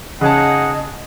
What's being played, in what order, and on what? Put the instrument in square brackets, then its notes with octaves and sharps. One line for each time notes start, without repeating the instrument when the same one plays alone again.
[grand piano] C#3 A5 [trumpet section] D#4 G#4 F#5 [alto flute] D#5